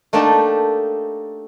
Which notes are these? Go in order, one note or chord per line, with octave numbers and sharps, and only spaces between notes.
A3 A#3 D4 D#4 G4 A4